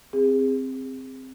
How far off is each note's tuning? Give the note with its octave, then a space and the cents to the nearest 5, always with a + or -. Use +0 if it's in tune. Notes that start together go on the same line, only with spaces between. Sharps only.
C4 +0 G#4 -25